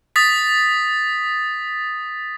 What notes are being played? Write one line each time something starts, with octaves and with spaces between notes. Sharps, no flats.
D#6 A6 B6